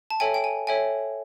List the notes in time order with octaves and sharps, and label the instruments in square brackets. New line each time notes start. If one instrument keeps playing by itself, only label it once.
[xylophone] A5
A4 C#5 E5 G5 G#5
G5
G#5
A4 C#5 E5 G5 G#5